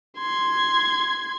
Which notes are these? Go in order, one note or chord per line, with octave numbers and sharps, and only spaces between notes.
C6 G#6